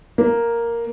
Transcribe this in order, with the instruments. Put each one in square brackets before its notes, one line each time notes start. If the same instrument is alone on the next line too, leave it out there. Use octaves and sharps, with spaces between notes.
[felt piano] A#3